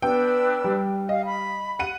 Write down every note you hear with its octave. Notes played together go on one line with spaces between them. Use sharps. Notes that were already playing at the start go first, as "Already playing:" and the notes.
B3 D4 B4 G5 E6
G3
D#5 F5
B5
F#5 D#7